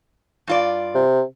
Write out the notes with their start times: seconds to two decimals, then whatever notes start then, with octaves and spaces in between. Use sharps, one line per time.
0.47 G2 F4 D5
0.95 C3